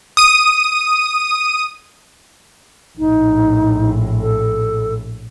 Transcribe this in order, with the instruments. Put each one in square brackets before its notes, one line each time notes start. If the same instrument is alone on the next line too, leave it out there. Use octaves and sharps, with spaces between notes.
[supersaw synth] D#6 D#7
[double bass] A#1 A2 [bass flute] D#4
[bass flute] A4